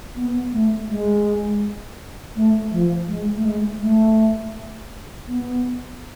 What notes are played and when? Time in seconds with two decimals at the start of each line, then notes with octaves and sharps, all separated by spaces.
0.16 B3
0.53 A3
0.89 G#3
2.36 A3
2.71 F3
3.08 G#3
3.36 A3
3.45 G#3
3.82 A3
5.28 B3